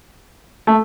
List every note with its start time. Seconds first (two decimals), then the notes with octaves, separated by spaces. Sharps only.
0.67 A3